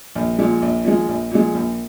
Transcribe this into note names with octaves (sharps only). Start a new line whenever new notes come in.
A#1
A#2 F3 G#3
A#1
A#2 F3 G#3
A#1
A#2 F3 G#3
A#1